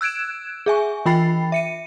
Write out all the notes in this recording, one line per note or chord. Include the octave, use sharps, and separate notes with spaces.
E6 F#6 G#6 D7 E7
G#4 E5 G#5 C#6
E3 F4 G5 B5 A6 C7
E5 C#7 D#7